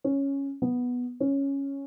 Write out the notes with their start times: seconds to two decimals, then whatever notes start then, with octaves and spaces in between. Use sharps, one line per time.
0.04 C#4
0.62 B3
1.20 C#4